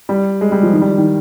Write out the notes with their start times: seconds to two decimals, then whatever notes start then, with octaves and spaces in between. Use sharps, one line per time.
0.09 G3
0.41 G#3
0.52 G3
0.63 F3
0.73 D#3
0.81 G3
0.98 D#3